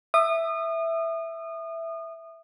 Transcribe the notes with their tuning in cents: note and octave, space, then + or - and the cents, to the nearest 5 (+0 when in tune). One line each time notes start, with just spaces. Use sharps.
E5 +0 D#6 -30